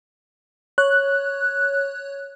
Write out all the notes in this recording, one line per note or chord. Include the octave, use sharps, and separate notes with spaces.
C#5 F#6